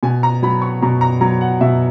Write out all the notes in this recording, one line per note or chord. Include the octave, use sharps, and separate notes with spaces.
B2 G#5
A#5
F#3 B5
C#6
B2 A#5
A#5
F#3 A#5
F#5
B2 E5